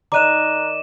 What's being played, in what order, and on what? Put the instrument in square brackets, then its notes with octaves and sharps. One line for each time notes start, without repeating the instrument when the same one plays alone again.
[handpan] D#3 D5 D#5 [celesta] A#5 F#6 [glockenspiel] D6 D#7 E7